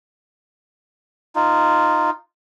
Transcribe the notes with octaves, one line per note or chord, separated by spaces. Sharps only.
D#4 F4